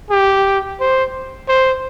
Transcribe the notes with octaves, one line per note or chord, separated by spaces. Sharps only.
G4
C5
C5